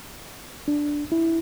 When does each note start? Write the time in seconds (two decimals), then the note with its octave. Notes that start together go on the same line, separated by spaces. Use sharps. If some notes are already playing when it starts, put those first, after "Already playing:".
0.68 D4
1.12 E4